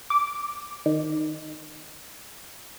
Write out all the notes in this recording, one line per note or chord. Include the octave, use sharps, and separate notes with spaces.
D6
D#3